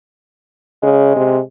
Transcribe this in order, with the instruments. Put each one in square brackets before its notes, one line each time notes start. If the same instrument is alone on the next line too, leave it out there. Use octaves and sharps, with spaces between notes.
[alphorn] C#3 [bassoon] G#3
[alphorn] C3